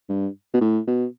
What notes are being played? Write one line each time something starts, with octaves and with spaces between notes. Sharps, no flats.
G2
B2
A2
B2